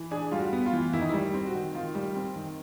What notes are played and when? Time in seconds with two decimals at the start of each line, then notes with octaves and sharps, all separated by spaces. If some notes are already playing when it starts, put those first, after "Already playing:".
Already playing: E3
0.11 D4 G#4
0.32 G3 F4
0.39 F#4
0.53 B3
0.66 F4
0.73 E3
0.93 D#3 E4
1.01 D#4
1.09 E4
1.13 G3
1.34 C4
1.47 F#4
1.54 D#3
1.75 D#3 F4
1.95 G3
2.16 C4
2.36 D#3